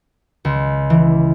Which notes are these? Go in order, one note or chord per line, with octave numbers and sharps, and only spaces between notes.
C#2
E3